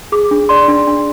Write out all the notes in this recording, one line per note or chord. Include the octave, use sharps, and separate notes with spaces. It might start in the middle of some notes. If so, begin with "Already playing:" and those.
G#4 D6
D4
D5 C6
D4
D4